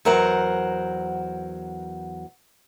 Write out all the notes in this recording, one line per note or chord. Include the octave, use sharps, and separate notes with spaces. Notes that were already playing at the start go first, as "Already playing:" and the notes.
E2 F#3 A#4 C5 F#5